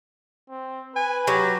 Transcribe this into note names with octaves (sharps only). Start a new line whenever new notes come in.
C4
B4 G#5
F#3 G4